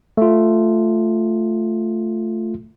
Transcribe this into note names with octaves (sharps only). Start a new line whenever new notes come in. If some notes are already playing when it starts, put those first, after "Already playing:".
A3 F4